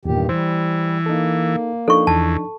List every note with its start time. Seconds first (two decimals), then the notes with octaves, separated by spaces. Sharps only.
0.05 E2 G2 A#2 D#3 G4
0.29 E3 G3 C5
1.06 A#3 D#4 A4
1.88 F3 D4 D#4 A4 C#6
2.07 E2 A5